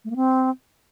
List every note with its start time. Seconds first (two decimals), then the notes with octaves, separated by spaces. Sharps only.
0.04 A3
0.10 A#3
0.16 C4